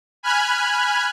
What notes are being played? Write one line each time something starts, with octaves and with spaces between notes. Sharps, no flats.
G#5 B5 F6 F#6 G#6